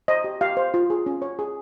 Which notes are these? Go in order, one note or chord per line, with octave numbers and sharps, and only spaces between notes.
C5 D#5
G4
G4 F5
C5
F4
G#4
C#4
C#5
G#4